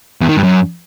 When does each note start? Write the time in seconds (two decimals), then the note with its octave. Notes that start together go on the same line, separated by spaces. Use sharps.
0.21 E2
0.29 D#3
0.36 G2
0.44 F#2